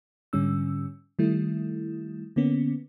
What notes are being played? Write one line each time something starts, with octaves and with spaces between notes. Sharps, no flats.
G#2 D3 G3 C#4 E6
D#3 G3 A3 E4
D3 A#3 B3 C#4